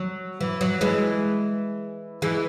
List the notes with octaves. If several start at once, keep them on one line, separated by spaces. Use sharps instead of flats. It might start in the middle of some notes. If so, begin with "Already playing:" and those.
Already playing: F#3
E3
F#3
E3 G#3
E3 G#3